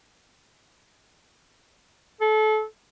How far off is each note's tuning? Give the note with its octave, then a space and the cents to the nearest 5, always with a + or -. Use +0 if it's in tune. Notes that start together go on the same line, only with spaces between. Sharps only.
A4 -30